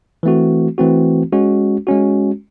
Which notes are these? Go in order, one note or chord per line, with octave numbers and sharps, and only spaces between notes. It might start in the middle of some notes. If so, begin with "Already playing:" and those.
E3 A3 C4 F#4
E3 A3 C4 F#4
G#3 C#4 F#4
G#3 C#4 F#4